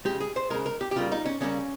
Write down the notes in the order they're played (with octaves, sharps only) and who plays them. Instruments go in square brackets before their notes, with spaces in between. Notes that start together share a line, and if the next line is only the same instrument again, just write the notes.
[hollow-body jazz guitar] C#3 G#3 G4
G#4
C5
C#3 G#3 A#4
A#4
G4
G4
C#3 G3 A#3 F4
D#4
C#4
C#3 G3 A#3 C#4